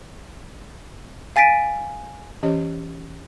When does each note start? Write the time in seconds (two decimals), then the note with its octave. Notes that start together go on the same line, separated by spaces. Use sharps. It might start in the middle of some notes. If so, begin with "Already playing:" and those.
1.36 F5 G#5 A6 B6 D7 D#7
2.43 E3 C#4 G4 C#5 D#5